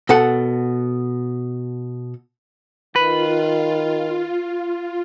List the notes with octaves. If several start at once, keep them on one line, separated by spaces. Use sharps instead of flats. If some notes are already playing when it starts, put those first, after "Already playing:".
B2 A4 F#5
D#3 F4 B4